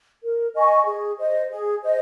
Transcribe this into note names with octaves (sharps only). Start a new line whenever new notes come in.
A#4
D#5 G#5 C#6
G#4
C5 D#5
G#4
C5 D#5